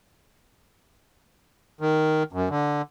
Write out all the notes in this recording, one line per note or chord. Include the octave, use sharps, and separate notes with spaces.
D#3
F#2
D3